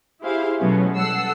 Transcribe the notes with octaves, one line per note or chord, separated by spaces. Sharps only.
E4 G4 G#4 C5 F5
B2 F#3 A3 B3 C#4
G3 A4 F#5 E6 C7